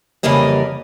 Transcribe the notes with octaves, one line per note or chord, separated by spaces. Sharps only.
F2 C#3 E3 G3 A#3 D#5